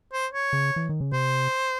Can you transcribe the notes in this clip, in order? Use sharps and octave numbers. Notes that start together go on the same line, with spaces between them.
C5
C#5
C#3
E3
D#3
C#3
C3 C5